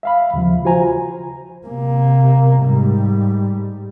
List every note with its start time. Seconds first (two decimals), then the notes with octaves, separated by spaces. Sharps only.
0.03 E5 F5 B5
0.34 D#2 C#3 F3
0.65 F4 F#4 C5 G#5 A#5
1.67 C3 A#3
2.63 G#2 G3